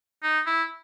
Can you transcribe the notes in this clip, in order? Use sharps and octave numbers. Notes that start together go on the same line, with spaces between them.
D#4
E4